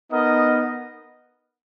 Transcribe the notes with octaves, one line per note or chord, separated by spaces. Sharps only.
B3 D#4 A#4 D#5